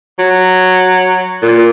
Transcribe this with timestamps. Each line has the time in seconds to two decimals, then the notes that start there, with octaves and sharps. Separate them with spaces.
0.19 F#3
1.42 A#2